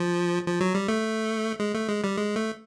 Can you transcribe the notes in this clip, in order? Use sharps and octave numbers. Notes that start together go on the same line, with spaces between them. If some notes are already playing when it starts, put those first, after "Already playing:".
Already playing: F3
F3
F#3
G3
A3
G#3
A3
G#3
G3
G#3
A3